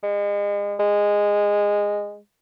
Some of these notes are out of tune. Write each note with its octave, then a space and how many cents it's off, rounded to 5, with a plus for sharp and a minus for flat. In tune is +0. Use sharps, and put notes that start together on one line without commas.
G#3 -35
G#3 -15